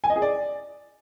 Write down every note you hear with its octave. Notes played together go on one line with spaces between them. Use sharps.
G#5
D#5
G#4
D5